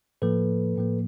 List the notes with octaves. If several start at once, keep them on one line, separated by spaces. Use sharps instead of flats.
A2 F3 A#3 A4 B4
A2 F3 A#3